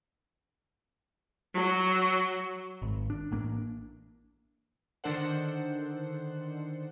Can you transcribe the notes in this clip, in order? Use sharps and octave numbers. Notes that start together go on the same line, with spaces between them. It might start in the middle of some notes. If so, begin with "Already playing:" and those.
F#3
G#1
D4
A1 A#3 D4
D3 D#3 D4 A4 C5 F#5